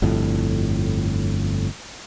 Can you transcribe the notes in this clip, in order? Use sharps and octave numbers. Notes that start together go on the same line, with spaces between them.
G1 F2 A2